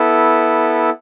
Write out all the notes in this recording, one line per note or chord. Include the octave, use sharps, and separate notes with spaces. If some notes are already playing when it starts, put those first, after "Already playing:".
Already playing: B3 E4 A4